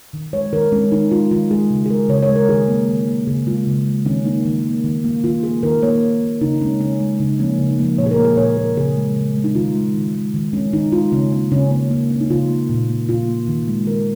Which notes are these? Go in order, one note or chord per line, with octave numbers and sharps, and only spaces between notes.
D#3
G#3 C#5
D#3 A#4
G#3 C#4
D#3 D#4
G#3 F4
D#3 F4
G#3 G#4
C#3
G#4
G#3 A#4
C#3 C#5
C#5
G#3
A#4
D#3 G#4
A#3
D#3
A#3
C#3 G#4
G#3 F4
C#3
G#3
D#3 C#4
A#3 D#4
D#3
A#3
D#3
A#3
D#3 F4
A#3 G#4
D#3 A#4
A#3 C#5
D#3
A#3
C#3 D#4
G#3 C#4
C#3 C#4
G#3
C#3 D#4
F3 A#3 C#4
C#3 D#4
F3 A#3
A#2 C#5
G#4
A#4
A#3
G#4
A#2 C#5
A#3 A#4
C#3 G#4
G#3
C#3
G#3
D#4
D#3 F4
G#3
D#3
G#3
D#3
G#3 C#4
D#3 D#4
G#3 F4
C#3 C#4
A#3 C#4
C#3 C#4
A#3 C#4
C#3 A#3
A#3 C#4
D#4
C#3 F4
A#3
A#2
A#3
A#2 F4
A#3
D#3
G#3
D#3 A#4